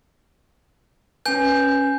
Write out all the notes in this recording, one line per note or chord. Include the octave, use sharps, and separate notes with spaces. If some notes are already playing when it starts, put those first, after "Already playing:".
C#4 B4 G#5 G6